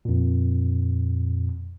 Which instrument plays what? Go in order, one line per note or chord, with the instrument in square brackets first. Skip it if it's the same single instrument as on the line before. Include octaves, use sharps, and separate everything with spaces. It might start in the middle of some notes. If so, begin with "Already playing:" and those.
[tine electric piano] F2 A#2